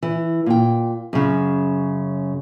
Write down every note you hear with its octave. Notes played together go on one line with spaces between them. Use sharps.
E3
A#2 G5
F#2 C#3